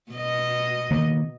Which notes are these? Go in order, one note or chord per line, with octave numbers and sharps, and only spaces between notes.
B2 D#5
D#3 A#3 B3